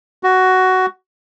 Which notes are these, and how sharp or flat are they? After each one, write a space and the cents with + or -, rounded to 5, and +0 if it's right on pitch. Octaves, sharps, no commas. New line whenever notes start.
F#4 +10